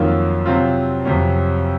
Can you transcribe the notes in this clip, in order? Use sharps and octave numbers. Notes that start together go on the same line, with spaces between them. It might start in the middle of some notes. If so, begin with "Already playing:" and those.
Already playing: F2 D#3 F#3 A#3 F4
C3 F#3 C4 F4
F2 C3 F#3 C#4